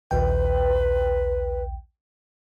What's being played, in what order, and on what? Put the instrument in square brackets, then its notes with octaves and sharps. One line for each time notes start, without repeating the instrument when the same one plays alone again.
[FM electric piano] A#1 D#2 G5 [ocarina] B4